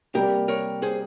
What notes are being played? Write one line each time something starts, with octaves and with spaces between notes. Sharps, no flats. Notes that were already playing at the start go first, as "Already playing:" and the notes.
C3 G3 A#3 G4 A#4
A#4 C#5
G#4 C5